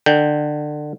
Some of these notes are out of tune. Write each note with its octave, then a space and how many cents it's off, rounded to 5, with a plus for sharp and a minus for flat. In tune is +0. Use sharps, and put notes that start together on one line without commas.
D3 +25 G5 +5